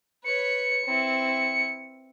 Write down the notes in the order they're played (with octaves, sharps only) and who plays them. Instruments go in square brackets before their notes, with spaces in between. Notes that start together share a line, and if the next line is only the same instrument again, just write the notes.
[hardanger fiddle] B4 C#5 [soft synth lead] C#7
[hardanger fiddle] C4 E4